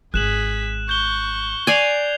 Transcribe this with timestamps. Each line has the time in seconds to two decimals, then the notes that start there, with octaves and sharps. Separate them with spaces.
0.14 G#1 G#4 F#6 B6 E7 F#7
0.89 C#6 G6 G7
1.67 D5 G#5 G#6 C7 F7